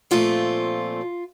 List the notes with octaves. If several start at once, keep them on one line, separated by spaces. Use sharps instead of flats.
A#2 F3 A3 C4 F4